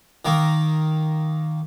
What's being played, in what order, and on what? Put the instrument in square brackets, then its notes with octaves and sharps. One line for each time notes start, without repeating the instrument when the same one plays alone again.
[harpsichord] D#3 A#3